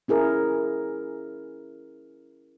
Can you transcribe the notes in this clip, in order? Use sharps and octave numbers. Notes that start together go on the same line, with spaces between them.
C#4 E4 G#4 A#4